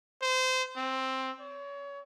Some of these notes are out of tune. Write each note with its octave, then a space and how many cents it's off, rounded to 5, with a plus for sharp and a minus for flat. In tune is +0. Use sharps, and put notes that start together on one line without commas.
C5 -25
C4 +10
C#5 +30